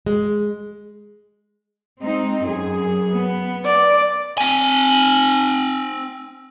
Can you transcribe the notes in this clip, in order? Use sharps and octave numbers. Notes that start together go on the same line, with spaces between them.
G#3
G#3 C4 D#4
F#2 G#4
B3
D5
C4 G#5